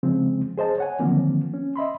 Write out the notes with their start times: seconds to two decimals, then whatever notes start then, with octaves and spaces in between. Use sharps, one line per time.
0.03 C#3 F3 G#3 C4
0.58 G#4 C5 D#5 A5
0.78 C#5 F#5 G#5
1.00 D3 D#3 F3 F#3 A#3 C4
1.54 C#4
1.76 D#5 E5 B5 C6